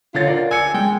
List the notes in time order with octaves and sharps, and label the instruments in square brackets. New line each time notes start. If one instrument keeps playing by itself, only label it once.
[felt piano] D3 C#5 A6 [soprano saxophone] F4
[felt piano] A#4 D5
[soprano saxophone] G#5 [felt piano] E6 C#7
[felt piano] G#3 [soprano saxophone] G5